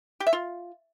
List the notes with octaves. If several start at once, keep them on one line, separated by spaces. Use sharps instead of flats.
G4
E5
F4